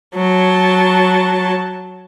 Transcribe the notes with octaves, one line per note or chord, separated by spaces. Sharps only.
F#3 A5